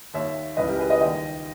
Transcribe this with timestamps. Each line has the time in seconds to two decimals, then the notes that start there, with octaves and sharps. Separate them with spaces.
0.14 D#2 D#3 C#5 E5
0.57 C#2 C#3 E3 B4 D#5
0.68 G4 A#4
0.79 G#4 B4
0.90 B4 D#5
1.01 D#2 D#3 D#5 G5